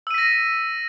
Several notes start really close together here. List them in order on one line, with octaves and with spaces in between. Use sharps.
E6 D#7 B6 A#6